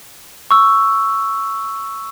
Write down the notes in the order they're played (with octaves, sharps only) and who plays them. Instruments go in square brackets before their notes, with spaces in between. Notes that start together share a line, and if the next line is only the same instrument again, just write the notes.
[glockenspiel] C#6 E6